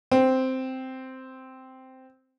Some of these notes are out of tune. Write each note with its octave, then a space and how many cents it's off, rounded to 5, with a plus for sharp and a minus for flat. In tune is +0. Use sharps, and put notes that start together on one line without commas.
C4 -5